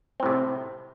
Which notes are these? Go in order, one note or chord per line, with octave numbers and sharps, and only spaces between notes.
A2 C3 C4